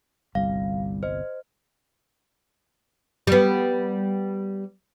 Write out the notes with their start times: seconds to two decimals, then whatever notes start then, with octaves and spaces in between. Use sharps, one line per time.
0.35 G1 C2 G3 F5
1.03 C5 D#5
3.27 G3 B3